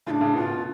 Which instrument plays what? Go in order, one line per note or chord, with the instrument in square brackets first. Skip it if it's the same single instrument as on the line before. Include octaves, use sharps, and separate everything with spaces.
[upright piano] A2 C#3 [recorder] D4 F4
[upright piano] A2 C#3
[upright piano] B2 [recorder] F4
[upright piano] B2